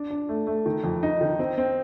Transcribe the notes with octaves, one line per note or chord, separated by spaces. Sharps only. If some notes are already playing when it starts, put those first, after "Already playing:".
Already playing: D4
D4
A3
A3
D#3
F2
D#4
D#3
C4
C4